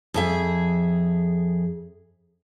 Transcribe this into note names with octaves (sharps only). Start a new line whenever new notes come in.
F2 G#4 E5